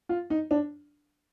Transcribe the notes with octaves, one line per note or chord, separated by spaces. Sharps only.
F4
D#4
D4